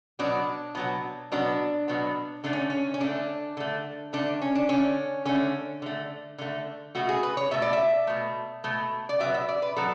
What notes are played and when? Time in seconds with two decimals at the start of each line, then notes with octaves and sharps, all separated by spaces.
0.19 B2 F#3 B3 D4
0.75 B2 F#3 B3
1.32 B2 F#3 B3 D4
1.88 B2 F#3 B3
2.44 D3 A3 D4
2.53 C#4
2.70 C#4
2.94 C#4
3.00 D3 A3 D4
3.57 D3 A3
4.13 D3 A3 D4
4.41 C#4
4.55 D4
4.69 D3 A3 C#4
5.25 D3 A3 C#4
5.82 D3 A3
6.38 D3 A3
6.95 B2 A3 F#4
7.09 G#4
7.23 B4
7.37 C#5
7.51 B2 A3 E5
7.62 D5
7.73 E5
8.07 B2 A3
8.64 B2 A3
9.09 D5
9.20 B2 F#3 B3 E5
9.34 E5
9.49 D5
9.62 B4
9.76 B2 F#3 B3 A4